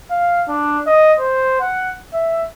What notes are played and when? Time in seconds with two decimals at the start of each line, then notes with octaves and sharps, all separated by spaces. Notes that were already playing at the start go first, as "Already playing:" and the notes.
0.11 F5
0.48 D4
0.87 D#5
1.19 C5
1.61 F#5
2.14 E5